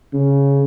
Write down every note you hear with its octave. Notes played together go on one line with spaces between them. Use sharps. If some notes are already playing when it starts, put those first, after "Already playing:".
C#3